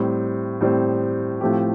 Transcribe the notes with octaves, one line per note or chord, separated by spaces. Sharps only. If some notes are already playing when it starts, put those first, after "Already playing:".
Already playing: A2 G3 C4
A2 G3 C4
A2 F3 A3 C4 G4